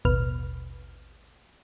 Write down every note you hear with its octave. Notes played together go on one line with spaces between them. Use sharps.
A1 D#2 B2 B4 F6